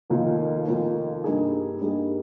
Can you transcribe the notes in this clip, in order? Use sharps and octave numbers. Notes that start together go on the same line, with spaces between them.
F1 D#2 D#3 A#3 F4
F1 D#2 D#3 A#3 F4
G2 G3 A#3 D#4 G#4
G2 G3 A#3 D#4 G#4